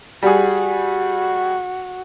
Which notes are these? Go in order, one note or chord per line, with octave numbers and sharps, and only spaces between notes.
G3 F#4 G#4